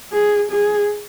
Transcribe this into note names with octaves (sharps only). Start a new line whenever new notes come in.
G#4
G#4